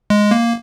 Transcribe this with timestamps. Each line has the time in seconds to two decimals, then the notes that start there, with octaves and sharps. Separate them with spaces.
0.10 G#3
0.31 A#3